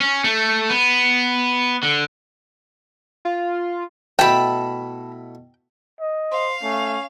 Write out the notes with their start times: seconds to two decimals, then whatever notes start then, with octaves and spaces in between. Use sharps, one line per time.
0.01 C#4
0.24 A3
0.70 B3
1.83 D3
3.25 F4
4.19 B2 A3 E4 G5 A5 B5
6.00 D#5
6.32 C5 F5
6.63 A3 C#4